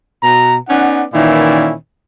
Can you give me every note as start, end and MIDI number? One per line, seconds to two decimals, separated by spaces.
0.23 0.57 47
0.23 0.57 82
0.69 1.03 59
0.69 1.03 61
0.69 1.03 63
0.69 1.03 74
0.69 1.03 78
1.14 1.74 46
1.14 1.74 51
1.14 1.74 52
1.14 1.74 61
1.14 1.74 64
1.14 1.74 74